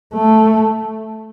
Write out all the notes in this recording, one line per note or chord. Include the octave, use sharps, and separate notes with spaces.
A3